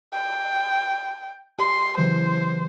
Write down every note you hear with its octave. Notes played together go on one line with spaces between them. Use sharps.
G5
G4 C6
C#3 E3 F#3 C5